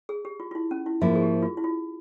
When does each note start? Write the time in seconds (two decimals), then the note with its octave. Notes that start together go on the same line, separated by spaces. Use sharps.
0.09 G#4
0.25 G4
0.40 F4
0.51 F4
0.55 E4
0.71 C#4
0.86 E4
1.01 G#2 F3 A#3 E4 F4
1.15 G#4
1.22 G4
1.42 F4
1.57 E4
1.64 F4